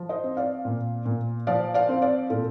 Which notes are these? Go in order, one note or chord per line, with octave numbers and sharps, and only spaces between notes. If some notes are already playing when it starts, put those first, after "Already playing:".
Already playing: F3
C5 D#5
C4
D5 F5
A#2
A#2
F3 D5 F5
D5 F5
C4
D5 F5
A#2 F4 A4